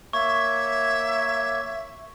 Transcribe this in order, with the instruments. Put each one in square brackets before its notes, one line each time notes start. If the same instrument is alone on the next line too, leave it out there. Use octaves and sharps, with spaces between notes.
[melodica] A#3 C#5 [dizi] E5 [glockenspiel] C#6